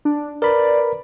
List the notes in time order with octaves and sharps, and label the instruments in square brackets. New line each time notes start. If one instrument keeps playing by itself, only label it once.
[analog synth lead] D4
[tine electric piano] A#4 B4 B5 [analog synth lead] D5